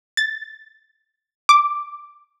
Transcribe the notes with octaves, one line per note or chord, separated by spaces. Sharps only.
A6
D6